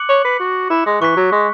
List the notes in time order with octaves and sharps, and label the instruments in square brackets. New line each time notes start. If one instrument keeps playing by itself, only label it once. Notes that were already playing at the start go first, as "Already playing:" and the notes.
Already playing: [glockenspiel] D6 F#6 C#7 F#7
[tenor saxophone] C#5
B4
F#4
E4
G#3
[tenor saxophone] E3 [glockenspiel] C#6 F#6 B6
[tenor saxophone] F#3
G#3